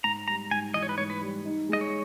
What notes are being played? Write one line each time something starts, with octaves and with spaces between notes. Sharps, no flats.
G#2 A#5
G3 A#5
G#2 G#5
E3 D#5
C#5
B4
G#2 C#5
B4
G3
D#4
G#3 D#5
C#5